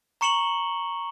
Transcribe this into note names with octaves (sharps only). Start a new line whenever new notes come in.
A#5 C#6 C#7 E7 F#7 G7